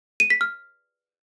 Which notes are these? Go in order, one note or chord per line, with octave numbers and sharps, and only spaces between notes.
D#7
B6
F6